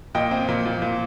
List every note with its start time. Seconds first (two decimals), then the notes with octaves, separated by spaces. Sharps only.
0.15 A#2 D#5 G5
0.31 C4
0.48 A#2
0.65 A#2
0.82 A#2